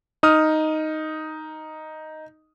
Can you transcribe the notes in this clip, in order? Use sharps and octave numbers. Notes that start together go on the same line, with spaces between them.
D#4 D#6 F6